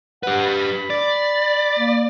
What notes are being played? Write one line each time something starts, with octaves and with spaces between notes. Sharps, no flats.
G4 B4 F#5
B5
D5
A#3